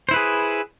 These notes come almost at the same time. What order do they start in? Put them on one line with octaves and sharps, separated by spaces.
C5 E4 B4 G#4